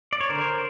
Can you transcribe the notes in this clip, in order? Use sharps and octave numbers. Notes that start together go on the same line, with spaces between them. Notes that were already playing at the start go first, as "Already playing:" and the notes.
D5
C#5
D3 A#4 C5